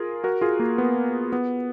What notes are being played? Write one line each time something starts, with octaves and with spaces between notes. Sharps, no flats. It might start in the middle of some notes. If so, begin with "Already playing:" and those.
Already playing: F4 G#4 A#4
F#4 A#4
F4 G#4
A#3
B3
B3